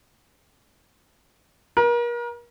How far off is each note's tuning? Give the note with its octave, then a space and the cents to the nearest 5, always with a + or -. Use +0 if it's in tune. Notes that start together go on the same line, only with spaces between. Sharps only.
A#4 +35